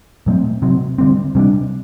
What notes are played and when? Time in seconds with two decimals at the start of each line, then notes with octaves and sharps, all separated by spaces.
0.26 A#2 F#3 A3 C4
0.62 C3 F#3 C4
0.98 D3 G3 C4
1.35 C3 G3 A#3 D4